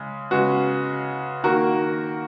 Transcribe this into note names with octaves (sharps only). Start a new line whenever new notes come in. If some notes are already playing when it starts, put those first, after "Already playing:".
Already playing: C#3 G#3
C#3 G#3 B3 F#4
D#3 A#3 F#4 A#4